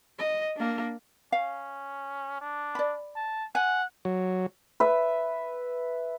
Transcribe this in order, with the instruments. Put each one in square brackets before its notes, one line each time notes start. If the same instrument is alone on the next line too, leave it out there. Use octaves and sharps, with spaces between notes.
[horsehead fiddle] D#5
A#3 D4
[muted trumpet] C#4 [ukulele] F5
[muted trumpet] D4
[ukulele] D5 B5
[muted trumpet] A5
[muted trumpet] F#5 [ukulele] G#5
[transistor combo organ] F#3
[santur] B4 E5